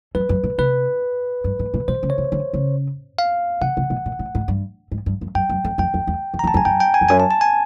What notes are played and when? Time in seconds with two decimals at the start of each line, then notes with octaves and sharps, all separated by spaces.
0.15 F#2 B4
0.29 F#2
0.44 A#2
0.58 C3 B4
1.44 G2
1.59 G#2
1.74 A#2
1.88 B2 C5
2.03 C#3
2.10 C#5
2.18 C3
2.32 D3
2.53 C#3
3.18 F5
3.61 C3 F#5
3.77 C3
3.90 B2
4.06 A#2
4.19 A2
4.35 G#2
4.48 G2
4.91 G#2
5.06 G2
5.21 F#2
5.35 F#2 G5
5.49 F#2
5.64 F2
5.78 F2 G5
5.94 F2
6.07 E2
6.34 E2
6.39 A#5
6.44 E2
6.48 A5
6.54 F2
6.57 G#5
6.65 F#2 G5
6.80 G5
6.94 G#5
7.01 F2
7.09 F#2 G#5
7.20 A5
7.31 A5
7.41 G#5